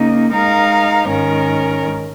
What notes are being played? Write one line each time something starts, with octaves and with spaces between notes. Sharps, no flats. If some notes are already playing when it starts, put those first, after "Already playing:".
Already playing: C#3 A#3 D#4
G#3 D#4 A#4 F5
G#2 D#3 C#4 A#4